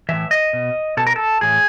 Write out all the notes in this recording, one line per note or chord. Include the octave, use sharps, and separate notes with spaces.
A2 E3 E5
D#5
B2
B2 A4
A#4
A4
A2 E3 G#4